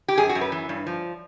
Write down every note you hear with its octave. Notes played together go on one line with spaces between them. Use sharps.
G4
F#2 G#4
F#4
F#2
B4
E3
G2
F3